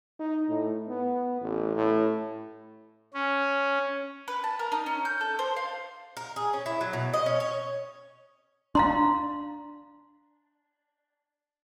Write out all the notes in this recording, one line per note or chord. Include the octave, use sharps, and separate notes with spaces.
D#4
A2
B3
A1
A2
C#4
B4
A5
A#4
D#4
C#4
G6
A4
C5
F5
A#4
G#4
C#4
E4
F#3
B2
D#5
C#4
C#5
D4 F5 A#5 C6